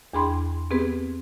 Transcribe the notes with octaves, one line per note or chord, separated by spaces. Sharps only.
E2 D4 G#4 G5 B5 C6
B3 C4 G4 G#4 B4